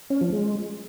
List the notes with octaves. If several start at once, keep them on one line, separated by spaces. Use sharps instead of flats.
C#4
F3
G#3